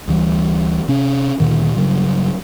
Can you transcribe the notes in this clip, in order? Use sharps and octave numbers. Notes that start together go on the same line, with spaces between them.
D2 E3 G3
C3 C#4
D2 A#2 D#3
G2 C#3 F#3